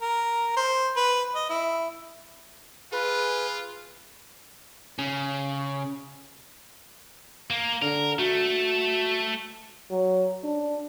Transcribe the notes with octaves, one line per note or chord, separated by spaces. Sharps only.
A#4
C5
B4
D#5
E4
F4 G#4 B4
C#3
A#3
D3 A#4
A3 F#4
F#3
D4